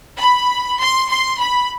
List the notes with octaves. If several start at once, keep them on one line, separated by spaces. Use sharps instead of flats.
B5
C6
C6
B5